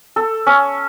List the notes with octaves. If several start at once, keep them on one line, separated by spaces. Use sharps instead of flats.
A4
C#4